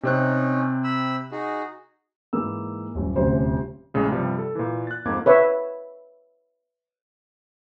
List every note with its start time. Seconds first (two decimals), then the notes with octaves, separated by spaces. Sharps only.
0.03 C3 C4 C#4 D#4 F#6
0.84 B5 E6
1.32 D#4 F#4 G#4
2.33 G#2 E3 A#3 E6
2.95 D#1 F#2
3.16 D#1 D2 C3 C#4 C5
3.94 A#1 A2 C#3 G#3
4.09 G2 C3 F3 G3
4.39 A4
4.55 A#2 E3
4.87 F#6 A6
5.05 F2 G#2 A#3 D6 G#6
5.26 B4 C#5 E5